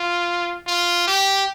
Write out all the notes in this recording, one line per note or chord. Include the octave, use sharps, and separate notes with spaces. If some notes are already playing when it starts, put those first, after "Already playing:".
Already playing: F4
F4
G4